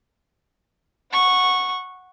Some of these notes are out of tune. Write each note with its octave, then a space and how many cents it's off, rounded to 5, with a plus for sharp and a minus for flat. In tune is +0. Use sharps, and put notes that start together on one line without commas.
F#5 -10 C#6 -10